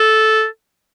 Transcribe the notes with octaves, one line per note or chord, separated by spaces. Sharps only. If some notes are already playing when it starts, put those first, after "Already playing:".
Already playing: A4